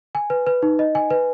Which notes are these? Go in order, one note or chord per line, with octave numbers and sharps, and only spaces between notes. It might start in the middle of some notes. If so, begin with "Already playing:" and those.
G#5
B4
B4
D#4
D#5
G#5
B4